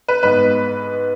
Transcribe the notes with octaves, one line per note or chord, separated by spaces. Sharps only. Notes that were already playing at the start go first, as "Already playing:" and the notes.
B4
G#2 G#3 B3 B4